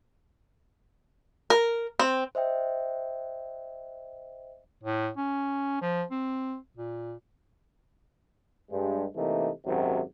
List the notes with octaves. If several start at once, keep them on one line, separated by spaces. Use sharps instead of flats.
A#4
C4
C5 D#5 E5 G5
A2
C#4
F3
C4
A#2
G2 G#3
C3 E3 A3 A#3 D#4
G#1 F#2 C3 D#3 F#3